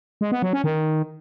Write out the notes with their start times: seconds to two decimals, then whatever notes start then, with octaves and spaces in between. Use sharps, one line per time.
0.21 G#3
0.32 B3
0.42 F#3
0.53 C#4
0.64 D#3